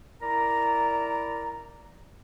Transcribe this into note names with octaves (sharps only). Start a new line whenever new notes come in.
E4 A#4 D5 A#5